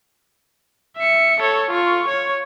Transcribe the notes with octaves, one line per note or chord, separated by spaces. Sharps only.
E5 C#7
A4 C#5
F4 C#6
C#5